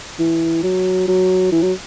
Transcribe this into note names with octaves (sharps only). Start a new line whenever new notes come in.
E3
F#3
F#3
E3
F#3